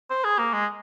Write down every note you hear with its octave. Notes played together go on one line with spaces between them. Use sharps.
C5
G#4
A#3
G#3